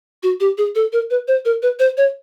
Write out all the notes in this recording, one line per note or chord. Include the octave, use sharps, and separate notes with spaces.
F#4
G4
G#4
A4
A#4
B4
C5
A#4
B4
C5
C#5